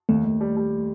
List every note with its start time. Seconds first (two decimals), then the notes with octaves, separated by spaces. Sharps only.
0.09 D#2 A3
0.25 D#2
0.41 G3
0.57 G3